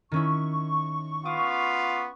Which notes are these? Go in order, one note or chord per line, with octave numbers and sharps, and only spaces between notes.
D#3 C#4 E4 C#6
B3 F4 F5 D6 D#6